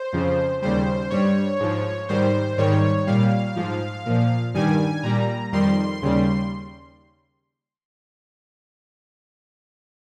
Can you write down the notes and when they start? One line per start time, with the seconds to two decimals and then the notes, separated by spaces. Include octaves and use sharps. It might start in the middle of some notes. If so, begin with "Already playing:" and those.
Already playing: C5
0.13 F2 C#3 F3
0.62 D#2 C#3 G3 C5
1.10 G2 G3 C#5
1.60 G#2 F3
2.08 G#2 D#3 G3 C5
2.58 G#2 D#3 G3 C#5
3.07 A#2 G3 F5
3.56 G#2 F3
4.06 A#2 F3
4.54 G2 D#3 G3 G#5
5.03 A#2 G3 A#5
5.52 F2 D#3 G3 C6
6.02 D#2 C#3 G3